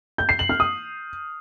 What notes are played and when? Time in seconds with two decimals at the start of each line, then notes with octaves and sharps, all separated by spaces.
0.18 G6
0.29 C7
0.39 F#7
0.49 F6
0.60 D#6